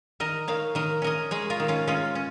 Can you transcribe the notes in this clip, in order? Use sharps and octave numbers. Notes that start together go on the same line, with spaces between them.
D#3 A#4 D#5
D#3 C#5 F5
D#3 A#4 D#5
C#4 A#4 D#5
G#3 G#4 C#5
F4 A#4
D#3
C#4 F4
G#3 C#4 F4
C#4